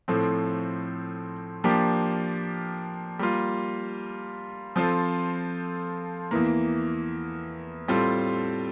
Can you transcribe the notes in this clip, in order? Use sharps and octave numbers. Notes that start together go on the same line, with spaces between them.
A2 F3 A3 C4
F3 A#3 D4 G4
G3 A#3 F4
F3 C4 F4 A4
E2 E3 A#3
A2 G3 C4 F4 A4